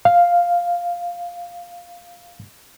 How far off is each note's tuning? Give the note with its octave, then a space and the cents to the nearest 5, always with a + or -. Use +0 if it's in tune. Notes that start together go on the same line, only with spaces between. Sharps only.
F5 +0